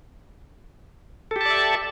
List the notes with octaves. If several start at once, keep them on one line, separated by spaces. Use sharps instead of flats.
G4 A4 D5 E5 A5